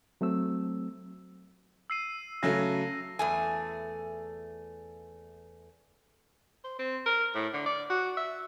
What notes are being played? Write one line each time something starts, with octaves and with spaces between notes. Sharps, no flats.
F#3 A3 C4 E6
E6 C7 D#7
C#3 F#3 A3 A#6
E2 A3 G#5
C5
C4
A#4
A2
D3
D5
F#4
E5